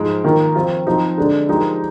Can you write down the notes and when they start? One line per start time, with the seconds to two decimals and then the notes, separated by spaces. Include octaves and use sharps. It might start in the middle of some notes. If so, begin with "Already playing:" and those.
Already playing: G#2 F3 G#3
0.24 D#3 A#3 F4 A#4
0.55 F3 C4 F4
0.87 F3 C4 D#4
1.17 D3 G#3 D4 G#4
1.49 F3 G#3 D#4 G4 A#4